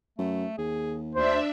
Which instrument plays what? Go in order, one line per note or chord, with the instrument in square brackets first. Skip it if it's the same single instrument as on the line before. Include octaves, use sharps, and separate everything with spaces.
[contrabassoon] F#2 [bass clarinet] A3
[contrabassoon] D#2 [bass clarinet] G#4
[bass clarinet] D2 [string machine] D4 E5 [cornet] C5